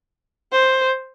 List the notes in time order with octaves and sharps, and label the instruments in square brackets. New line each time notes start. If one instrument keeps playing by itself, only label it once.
[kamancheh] C5